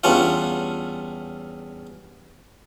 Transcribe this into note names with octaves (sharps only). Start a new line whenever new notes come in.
E2 G3 C#4 D4 F4 F#5